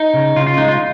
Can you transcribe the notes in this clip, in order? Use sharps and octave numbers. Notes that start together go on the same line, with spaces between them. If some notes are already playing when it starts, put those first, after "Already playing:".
Already playing: D#4
C#3
C#3 F4
F4
G#3 D#4
F4